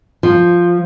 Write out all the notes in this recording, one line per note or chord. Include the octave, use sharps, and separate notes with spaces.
F3